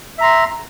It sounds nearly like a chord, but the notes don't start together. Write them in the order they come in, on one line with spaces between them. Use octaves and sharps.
E5 A#5 C6